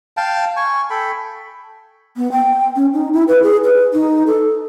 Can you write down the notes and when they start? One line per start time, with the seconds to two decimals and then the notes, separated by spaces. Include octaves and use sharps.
0.17 F5 G5 A5
0.56 G#5 C#6
0.90 A4 G5 B5
2.17 B3
2.32 G5
2.76 C#4
2.93 D#4
3.13 E4
3.28 B4
3.43 G#4
3.64 B4
3.93 D#4
4.27 A4